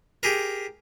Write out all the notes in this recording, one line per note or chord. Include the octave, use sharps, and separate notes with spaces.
G4 G#4 A#4